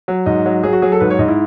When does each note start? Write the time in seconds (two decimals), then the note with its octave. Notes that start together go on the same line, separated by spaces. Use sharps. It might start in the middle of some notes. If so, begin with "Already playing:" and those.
0.08 F#3
0.26 G#2 D#5
0.46 F#3
0.63 F#3 G#4
0.73 F#4
0.82 F#3 G#4
0.92 A4
1.00 G#2 B4
1.10 C#5
1.19 G#2 D#5
1.28 E4